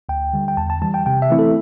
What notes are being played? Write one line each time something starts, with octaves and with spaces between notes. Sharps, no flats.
D2 G5
D3 G3
G5
E2 A5
A5
E3 G3 A5
G5
C3 G5
E5
E3 A3 C4 E4
A4